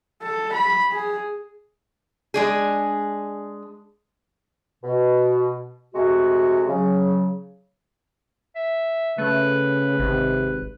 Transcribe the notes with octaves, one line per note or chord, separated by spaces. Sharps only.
A4
B5
G#4
G#3 D4 G#4
B2
C3 G#3 A3 F#4
C#3 F#3
E5
C#3 A3 B4
G#1 C3